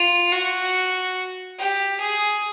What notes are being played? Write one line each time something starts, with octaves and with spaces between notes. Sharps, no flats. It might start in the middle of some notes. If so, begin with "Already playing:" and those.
Already playing: F4
F#4
G4
G#4